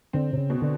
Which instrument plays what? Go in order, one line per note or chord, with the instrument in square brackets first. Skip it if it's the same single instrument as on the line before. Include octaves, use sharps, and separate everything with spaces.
[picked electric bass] D3 [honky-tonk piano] C4
[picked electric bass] C3
C#3
[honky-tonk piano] B2
[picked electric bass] D3